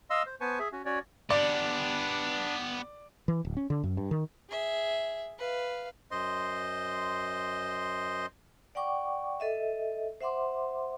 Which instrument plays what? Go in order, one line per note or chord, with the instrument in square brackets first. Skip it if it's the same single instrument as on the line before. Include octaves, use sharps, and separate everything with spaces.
[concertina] D#5 F5 C6 E6
C5
B3 B4 C5 G#5 A5 C#6
G#4 E5
C#4 F#4
C#4 F#4 C#5 D5
[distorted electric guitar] B3 G4 [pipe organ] D4 [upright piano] D5
[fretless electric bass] E3
D1
C#4
D3
F#2
G2
D#3
[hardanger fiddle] G#4 E5
B4 F5
[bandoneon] F#2 C5 D#5 C6
[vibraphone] D5 F#5 G5 C#6 D6
A4 D#5 E5
C5 E5 F#5 C6 D6